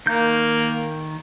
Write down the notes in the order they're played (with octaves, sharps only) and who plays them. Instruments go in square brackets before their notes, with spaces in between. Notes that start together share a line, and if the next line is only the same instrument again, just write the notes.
[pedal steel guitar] D#3 G6 [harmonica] A#3